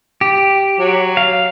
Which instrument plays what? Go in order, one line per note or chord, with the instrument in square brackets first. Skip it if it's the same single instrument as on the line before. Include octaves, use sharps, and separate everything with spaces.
[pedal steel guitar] G4
[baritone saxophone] F#3
[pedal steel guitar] F5